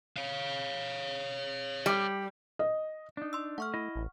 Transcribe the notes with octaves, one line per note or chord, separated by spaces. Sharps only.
C#5 F5
G3
D#5
D4 D#4
C6 E6
A3 F#5 C#6 F6
E4 D#5
A1